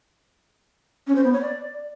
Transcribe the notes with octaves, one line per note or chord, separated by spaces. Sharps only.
C#4
C5
B3
C#5
D5